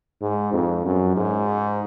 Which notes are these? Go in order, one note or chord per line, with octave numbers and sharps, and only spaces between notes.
G#2
F2
F#2
G#2